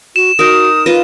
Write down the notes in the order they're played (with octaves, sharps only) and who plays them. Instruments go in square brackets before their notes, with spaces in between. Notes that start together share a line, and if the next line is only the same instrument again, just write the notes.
[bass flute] F#4 [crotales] E7
[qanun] D#4 A#4 [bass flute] F#4 [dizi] D#6
[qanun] F4 D#5 [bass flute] B4